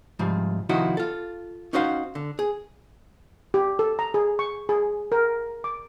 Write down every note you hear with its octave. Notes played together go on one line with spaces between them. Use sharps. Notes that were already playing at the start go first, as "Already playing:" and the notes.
C2 G#2 F3 G3
C3 D#3 F3 E4 F#4 D#5
F4 A4
C#4 D#4 F#4 C5 F5
D3
G#4
G4
A4
A#5
G#4
C#6
G#4
A#4
D6